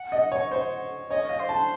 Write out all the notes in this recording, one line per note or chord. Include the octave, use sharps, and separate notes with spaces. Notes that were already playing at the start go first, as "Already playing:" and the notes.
Already playing: F#5
D#5
C#5
C5
C#5 D#5
F5
C5
A5